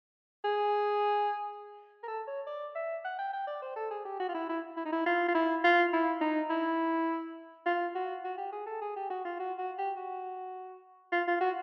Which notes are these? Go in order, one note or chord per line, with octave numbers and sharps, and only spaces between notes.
G#4
A#4
A4
C#5
D5
E5
F#5
G5
G5
D5
C5
A4
G#4
G4
F#4
F4
E4
E4
E4
D#4
E4
F4
F4
E4
F4
E4
D#4
E4
F4
F#4
F#4
G4
G#4
A4
G#4
G4
F#4
F4
F#4
F#4
G4
F#4
F4
F4
F#4